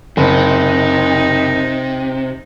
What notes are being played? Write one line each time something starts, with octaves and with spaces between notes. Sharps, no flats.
F#1 C3 D#4